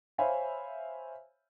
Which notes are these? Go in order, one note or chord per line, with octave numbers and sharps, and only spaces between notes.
C5 C#5 E5 F5 G#5 B5